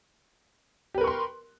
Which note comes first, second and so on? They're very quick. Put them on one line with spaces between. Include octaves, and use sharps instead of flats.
G4 B4 A#4 C#6 C6